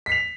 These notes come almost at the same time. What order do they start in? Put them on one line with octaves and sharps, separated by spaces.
B6 C7 F7